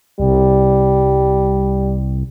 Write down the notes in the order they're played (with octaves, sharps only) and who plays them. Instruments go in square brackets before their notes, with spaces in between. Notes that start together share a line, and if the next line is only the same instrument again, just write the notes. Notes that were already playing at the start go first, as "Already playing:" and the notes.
[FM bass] C2 [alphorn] G3